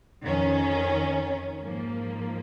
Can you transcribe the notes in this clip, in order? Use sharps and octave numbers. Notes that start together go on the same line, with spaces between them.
F2 D#3 C#4
G#2 F3 A#3